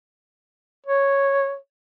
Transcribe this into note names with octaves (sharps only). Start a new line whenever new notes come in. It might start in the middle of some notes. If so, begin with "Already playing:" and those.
C#5